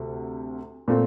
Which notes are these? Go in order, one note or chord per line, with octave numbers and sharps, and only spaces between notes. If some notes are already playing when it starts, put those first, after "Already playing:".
Already playing: D2 C3
A#2 A3 C4